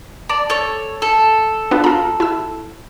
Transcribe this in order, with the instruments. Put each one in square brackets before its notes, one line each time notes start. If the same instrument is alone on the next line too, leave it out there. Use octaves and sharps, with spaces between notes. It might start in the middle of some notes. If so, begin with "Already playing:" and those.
[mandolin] D5 [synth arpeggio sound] A5
[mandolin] A4 C#5
A4
[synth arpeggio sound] B3 D4 F4
F4 A#5
E4 E6